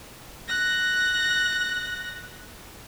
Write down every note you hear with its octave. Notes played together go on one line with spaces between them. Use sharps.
F#6 A#6